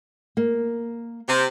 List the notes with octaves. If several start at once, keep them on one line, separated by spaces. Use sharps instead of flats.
A#3
C3